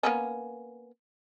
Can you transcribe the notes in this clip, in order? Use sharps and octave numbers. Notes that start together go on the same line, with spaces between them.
A#3 B3 C#4